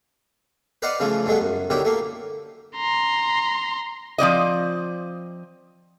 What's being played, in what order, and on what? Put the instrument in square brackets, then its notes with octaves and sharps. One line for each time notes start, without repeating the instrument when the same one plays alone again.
[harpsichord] B4 C5 D5 D#5 F5 F#5
C#3 E3 F3 A3
G2 G#3 A3 B3
F#2
D3 D#3 F#3 E4 G4
A3 A#3
[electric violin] A#5 C6
[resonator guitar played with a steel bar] F3 C4 D5 D#5